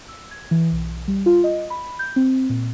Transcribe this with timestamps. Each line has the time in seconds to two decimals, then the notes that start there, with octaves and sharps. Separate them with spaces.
0.08 E6
0.31 G#6
0.51 E3
0.72 B1
1.08 G3
1.26 F4
1.44 D#5
1.70 B5
1.99 G6
2.16 C4
2.49 A#2